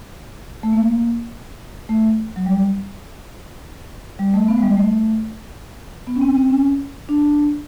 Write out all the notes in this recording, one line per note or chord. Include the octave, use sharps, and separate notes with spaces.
A3
A#3
A3
F#3
G3
G3
A3
B3
G#3
G3
A3
B3
C#4
C4
C4
C#4
D4